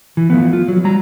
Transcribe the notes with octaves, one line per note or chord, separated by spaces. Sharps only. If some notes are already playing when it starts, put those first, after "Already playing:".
E3
F3 A3 B3
F4
F#3
G3 A#5